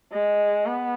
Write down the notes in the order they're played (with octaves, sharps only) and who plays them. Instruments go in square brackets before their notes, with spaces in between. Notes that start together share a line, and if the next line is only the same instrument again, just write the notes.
[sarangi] G#3
B3